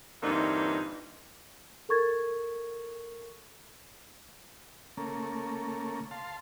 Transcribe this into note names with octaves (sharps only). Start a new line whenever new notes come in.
G2 A#2 D3 E3 C4 D#4
A4 A#4 C#6 G#6 A6
C#3 A3 A#3
F5 A5 C6